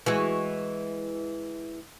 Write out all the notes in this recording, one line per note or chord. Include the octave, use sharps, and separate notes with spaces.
E3 G#3 F#4